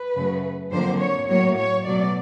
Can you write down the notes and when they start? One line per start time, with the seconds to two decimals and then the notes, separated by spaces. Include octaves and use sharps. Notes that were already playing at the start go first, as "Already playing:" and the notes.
Already playing: B4
0.14 F#2 C#3 F#3 A3
0.71 F2 D3 F#3 A#3 C5
0.99 C#5
1.28 A2 F#3 A#3 C#5
1.57 C#5
1.85 B2 F#3 A3 D5